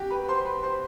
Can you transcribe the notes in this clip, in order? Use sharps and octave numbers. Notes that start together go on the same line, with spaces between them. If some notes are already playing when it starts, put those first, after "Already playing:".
Already playing: F#4 G4 G5
B4 B5
C5 C6
B4 B5
C5 C6